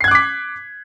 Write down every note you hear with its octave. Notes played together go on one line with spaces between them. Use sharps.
D6 F#6 G#6 B6 C7